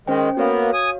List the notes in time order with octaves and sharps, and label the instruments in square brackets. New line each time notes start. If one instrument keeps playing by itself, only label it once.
[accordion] D#3 G#3 [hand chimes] C#4 C5 G5
[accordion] A#3 B3 [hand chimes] F#4 C#5 F5
[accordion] G#5 D#6